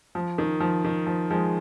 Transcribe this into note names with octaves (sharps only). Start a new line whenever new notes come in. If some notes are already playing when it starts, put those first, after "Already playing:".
F3
D#3
F3
D#3
F3
F3 G#3